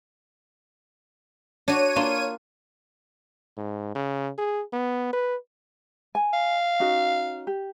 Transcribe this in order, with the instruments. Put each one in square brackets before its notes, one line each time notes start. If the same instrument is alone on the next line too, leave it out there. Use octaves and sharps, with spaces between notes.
[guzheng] D4 F#4 [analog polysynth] C#5 D#7
[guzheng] A#3 D4 F4
[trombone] G#2
C#3
G#4
B3
B4
[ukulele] G#5
[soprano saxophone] F5
[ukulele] C#4 D#4 F#4
G4